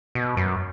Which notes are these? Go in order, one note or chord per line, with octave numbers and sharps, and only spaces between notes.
B2
F#2